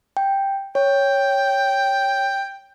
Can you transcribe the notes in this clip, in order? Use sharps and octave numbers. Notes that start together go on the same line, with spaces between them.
G5
C#5 G5